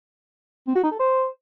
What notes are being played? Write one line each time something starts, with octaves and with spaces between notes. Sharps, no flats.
C4
F#4
D#4
A4
C5